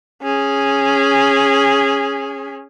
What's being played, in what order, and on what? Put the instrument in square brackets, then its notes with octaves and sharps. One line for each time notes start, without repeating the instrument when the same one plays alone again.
[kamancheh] C#4 G#4